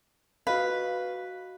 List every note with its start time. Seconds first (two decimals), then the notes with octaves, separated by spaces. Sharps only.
0.47 F#4 B4 D#5 F5